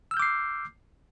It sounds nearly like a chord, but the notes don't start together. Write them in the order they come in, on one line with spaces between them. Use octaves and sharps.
E6 F6 G6 D6 C7